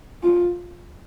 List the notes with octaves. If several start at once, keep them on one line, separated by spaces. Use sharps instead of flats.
F4